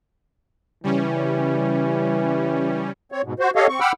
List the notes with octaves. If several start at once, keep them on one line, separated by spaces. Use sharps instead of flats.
C#3 E3 G3 C#4
C4 C#5
G#2 B2
F#4 C5
G4 A4 C#5 D#5 F5
C4 C#6
F#5 G5 B5 D6 E6 F6